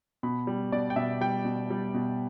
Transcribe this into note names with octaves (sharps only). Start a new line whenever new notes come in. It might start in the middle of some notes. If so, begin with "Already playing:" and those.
B2 B5
G3
B2 D5
G5
B2 E5
G3 G5
B2
G3
B2